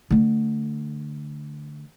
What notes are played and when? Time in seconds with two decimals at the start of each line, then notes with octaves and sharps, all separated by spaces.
0.11 D3 A3